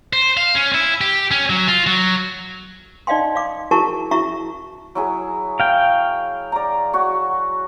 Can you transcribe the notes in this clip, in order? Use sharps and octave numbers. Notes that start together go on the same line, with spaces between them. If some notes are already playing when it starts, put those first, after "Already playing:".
C5
F5
C#4
E4
G4
C#4
F#3
F4
F#3
D#4 D5 D#5 F5 G5 C6
D5 F5 D6
E4 F#4 G#4 A#4 A5 C#6
E4 F#4 E5 A#5 C#6
F#3 E4 G#4
F5 G5
D5 A#5
F#4 C#5